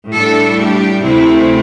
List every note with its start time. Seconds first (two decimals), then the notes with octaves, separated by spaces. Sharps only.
0.12 A2 G3 D4 A4
0.57 G4
1.02 D2 C3 A3 C4 E4